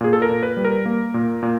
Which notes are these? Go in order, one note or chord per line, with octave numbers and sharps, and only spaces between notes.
A#2 G#4
A4
A#4
A#2
B4
G3
A#4
A#3
A#2
A#2